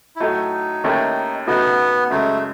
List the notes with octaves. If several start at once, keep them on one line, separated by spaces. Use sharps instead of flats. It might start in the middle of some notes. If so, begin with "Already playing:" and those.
E4
A2 F#3 A3 D#4
D#2 D#3 A3 C#4 E4
C#3 F#3 A3 B3 D#4 F#4
F#2 C#3 G#3 A3